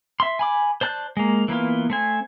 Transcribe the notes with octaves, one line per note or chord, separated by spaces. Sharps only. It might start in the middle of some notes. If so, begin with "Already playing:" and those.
E5 C6
G#5 B5 D6
C5 D5 A5 F#6 G6
G#3 A#3
E3 A#3 B3 F4
A3 C4 G#5